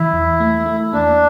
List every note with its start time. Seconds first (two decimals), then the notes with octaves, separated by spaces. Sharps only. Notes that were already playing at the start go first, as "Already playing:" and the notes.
Already playing: E3 E4
0.13 E2
0.40 A3
0.66 A3
0.93 A#3 D4